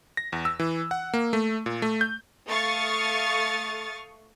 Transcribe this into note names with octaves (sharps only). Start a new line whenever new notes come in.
A#6
E2
E6
E3
F#5
A#3
A3
A#2
A3
G6
A3 F5 C#6 D#6 F6 A6